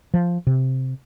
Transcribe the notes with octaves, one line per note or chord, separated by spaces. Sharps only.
F3
C3